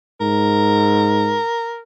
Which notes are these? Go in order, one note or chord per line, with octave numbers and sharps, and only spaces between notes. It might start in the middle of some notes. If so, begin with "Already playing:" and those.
G#2 A#4